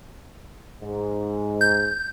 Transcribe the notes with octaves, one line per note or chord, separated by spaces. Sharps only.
G#2
G6